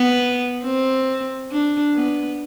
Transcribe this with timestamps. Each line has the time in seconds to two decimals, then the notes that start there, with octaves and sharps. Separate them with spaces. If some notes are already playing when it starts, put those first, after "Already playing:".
Already playing: B3
0.63 C4
1.51 D4
1.95 B3